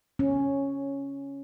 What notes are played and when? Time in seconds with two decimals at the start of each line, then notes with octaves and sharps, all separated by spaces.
0.19 C#4